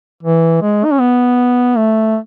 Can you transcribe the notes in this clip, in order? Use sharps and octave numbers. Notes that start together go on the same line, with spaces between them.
E3
G#3
D#4
C#4
B3
A3